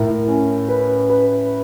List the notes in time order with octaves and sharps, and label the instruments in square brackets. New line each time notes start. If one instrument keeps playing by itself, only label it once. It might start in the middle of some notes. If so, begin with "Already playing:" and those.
Already playing: [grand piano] A2 [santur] A#4
[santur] C#4
B4
B4